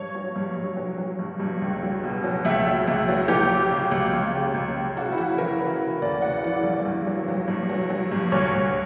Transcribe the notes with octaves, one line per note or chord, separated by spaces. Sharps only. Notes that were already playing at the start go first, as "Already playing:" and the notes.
Already playing: G2 C#5
F#3
G2
G2
F#3
F#3
G2
G2
C#2
F#3
B2
F#3
C#2 E5
F#3
C#2
F#3
C#2 G4
F#3
C#3
C#2
C#2
C#3
C#2
C#3
C#3 F#4
E4
E3 F#4
E3 A#4
C#3 B4
C#3
D2 D5
C#3 F#5
E3 D5
G2
G2
F#3
F#3
G2
F#3
F#3
G2
D2 C#5
D2